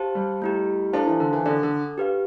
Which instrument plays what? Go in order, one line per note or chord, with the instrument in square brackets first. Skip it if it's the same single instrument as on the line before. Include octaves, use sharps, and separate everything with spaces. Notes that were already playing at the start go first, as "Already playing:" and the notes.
Already playing: [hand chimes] G4 C5 F5 A5
[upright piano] G3
[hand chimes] A3 E4 G4
[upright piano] D4 [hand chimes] E4 A4 C5 F5 A5
[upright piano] E3
D3
E3
[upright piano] D3 [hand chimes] D4 A4 D5
[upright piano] D3
[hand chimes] G4 B4 F5